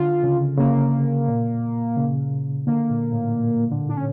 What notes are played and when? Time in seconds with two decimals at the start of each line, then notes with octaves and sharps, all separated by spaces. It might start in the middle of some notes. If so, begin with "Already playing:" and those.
Already playing: D3 F4
0.24 C#3
0.58 C#3 A#3
1.28 A#2
1.97 C#3
2.67 D3 A#3
2.90 A#2
3.12 A2
3.36 A#2
3.72 D3
3.89 D4
3.97 C#4